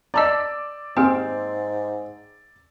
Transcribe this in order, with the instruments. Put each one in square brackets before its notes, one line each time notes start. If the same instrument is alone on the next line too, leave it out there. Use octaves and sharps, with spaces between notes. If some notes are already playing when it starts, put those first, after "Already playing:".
[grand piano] D5 D6 E6 [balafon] D#5 A5 A#5
[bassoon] G#2 [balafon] A#3 G4 G#5 [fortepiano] C4